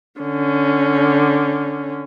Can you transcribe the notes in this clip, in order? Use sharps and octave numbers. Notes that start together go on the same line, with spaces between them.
D3 C#4